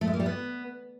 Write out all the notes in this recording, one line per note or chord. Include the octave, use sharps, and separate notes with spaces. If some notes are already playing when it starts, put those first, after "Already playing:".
A3
G#3
A#3
G3
B3